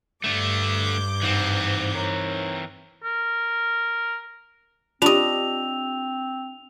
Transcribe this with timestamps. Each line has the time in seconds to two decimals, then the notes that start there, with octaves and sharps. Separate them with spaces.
0.24 G2 D3 A3 D6 G6
1.22 G#2 E3 C4
1.95 D#4 A#4 C#5
3.04 A#4
5.02 C4 D4 F4 G4 D#5 F7